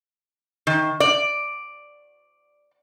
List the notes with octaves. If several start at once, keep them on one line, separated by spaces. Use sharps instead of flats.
D#3
D5